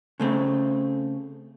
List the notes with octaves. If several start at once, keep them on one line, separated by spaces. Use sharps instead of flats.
C#3 A3 C4